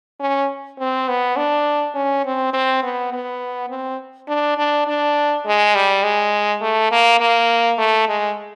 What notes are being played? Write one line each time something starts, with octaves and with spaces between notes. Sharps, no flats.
C#4
C4
B3
D4
C#4
C4
C4
B3
B3
C4
D4
D4
D4
G#3
G3
G#3
A3
A#3
A#3
A3
G#3